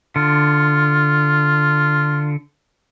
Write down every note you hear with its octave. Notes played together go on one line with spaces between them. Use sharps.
D3 F4